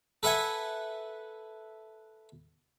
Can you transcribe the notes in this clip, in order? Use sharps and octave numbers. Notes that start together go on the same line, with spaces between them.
A4 B4 E5 F#5 G#5